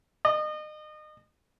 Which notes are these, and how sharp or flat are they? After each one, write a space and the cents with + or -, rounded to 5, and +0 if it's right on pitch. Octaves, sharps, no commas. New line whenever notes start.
D#5 -30